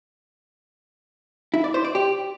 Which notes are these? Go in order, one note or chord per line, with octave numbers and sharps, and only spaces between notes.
E4
D5
C5
D5
G4